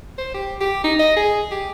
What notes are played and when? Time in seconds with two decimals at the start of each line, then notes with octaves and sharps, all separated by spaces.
0.18 C5
0.35 G4
0.61 G4
0.84 D#4
0.99 D#5
1.17 G#4
1.51 G4